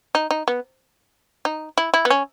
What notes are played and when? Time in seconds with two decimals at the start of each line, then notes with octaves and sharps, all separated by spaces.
0.15 D#4
0.31 D#4
0.48 B3
1.45 D#4
1.78 E4
1.94 E4
2.05 B3
2.10 C#4